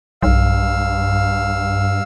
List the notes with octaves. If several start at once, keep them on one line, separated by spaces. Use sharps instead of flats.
B1 G2 F5 E6